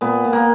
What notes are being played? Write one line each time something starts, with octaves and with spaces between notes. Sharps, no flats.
A#2 B3
A#2
A#3